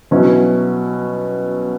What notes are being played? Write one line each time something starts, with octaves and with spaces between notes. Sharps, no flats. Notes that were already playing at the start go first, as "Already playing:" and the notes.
B2 F#3 C#4 E4